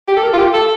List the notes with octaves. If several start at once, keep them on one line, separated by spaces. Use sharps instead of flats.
G4
A4
A#4
F4
G4
A4